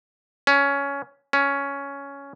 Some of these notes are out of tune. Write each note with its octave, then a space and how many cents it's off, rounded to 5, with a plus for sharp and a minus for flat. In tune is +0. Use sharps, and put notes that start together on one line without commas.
C#4 +15
C#4 +10